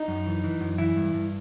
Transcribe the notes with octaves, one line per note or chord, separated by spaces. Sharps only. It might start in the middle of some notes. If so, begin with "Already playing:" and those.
Already playing: D#4
F#2
E3
E3
F#2
E3 E4
G2
G2